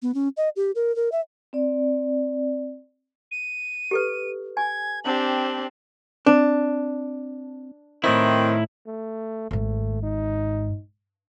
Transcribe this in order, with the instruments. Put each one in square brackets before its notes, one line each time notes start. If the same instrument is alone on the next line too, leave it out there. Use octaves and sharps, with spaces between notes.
[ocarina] B3
C#4
D#5
G4
A#4
A#4
E5
[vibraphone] C4 D5
[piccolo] D#7
[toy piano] G4 A4 B4
[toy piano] G#5 [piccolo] G#6
[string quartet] C4 D4 G4 [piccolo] F#7
[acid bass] C4 [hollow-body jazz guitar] D4
[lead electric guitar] A2 E4 [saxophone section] D#3 C4
[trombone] A3
[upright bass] G#1 G#2 [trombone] A3
[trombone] D#4